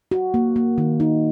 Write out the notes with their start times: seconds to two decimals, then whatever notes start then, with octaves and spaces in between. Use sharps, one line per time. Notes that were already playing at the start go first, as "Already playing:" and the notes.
0.11 F#4
0.34 A#3
0.56 A#3
0.78 D#3
1.00 D#4